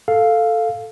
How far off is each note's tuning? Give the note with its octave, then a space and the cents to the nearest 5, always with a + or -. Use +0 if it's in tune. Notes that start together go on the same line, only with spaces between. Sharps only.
A4 +5 F5 +0